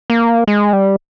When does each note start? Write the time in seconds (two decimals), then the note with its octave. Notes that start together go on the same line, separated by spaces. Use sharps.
0.10 A#3
0.47 G#3
0.73 G3